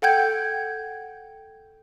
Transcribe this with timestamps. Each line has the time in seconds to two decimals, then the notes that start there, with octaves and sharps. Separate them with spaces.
0.02 A4 F#5 G5 G6 G#6